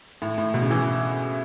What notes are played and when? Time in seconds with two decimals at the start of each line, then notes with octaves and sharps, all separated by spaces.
0.22 A2
0.38 A2
0.54 B2
0.62 C#3
0.71 E3